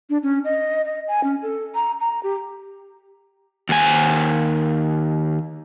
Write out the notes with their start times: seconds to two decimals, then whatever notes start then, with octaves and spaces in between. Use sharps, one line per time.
0.10 D4
0.23 C#4
0.45 D#5
0.85 D#5
1.08 G#5
1.24 C#4
1.42 A4
1.75 A#5
2.00 A#5
2.23 G4
3.69 D#2 G#5